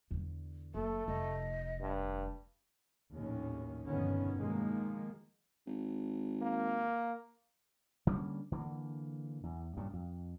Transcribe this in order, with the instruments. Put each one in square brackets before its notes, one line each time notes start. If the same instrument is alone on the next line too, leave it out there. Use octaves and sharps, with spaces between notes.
[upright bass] E2 D3
[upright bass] F#1 [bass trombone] A3 [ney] A4
[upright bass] F1 [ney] D#5
[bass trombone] G2
[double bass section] A#1 D#2 A2 D#3 C#4
G1 F2 B2 D#3 B3 C#4
B2 D#3 F3 G#3 A#3
[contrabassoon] G#1
[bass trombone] A#3
[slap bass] D3 G3 A#3 C#4
D3 E3 G3 A#3
E2
G2 A#2 C#3
F2